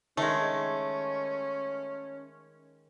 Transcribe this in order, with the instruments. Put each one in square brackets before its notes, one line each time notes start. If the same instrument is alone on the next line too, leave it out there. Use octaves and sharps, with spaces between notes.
[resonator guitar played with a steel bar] D#3 G#3 [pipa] A3 [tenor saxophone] C#4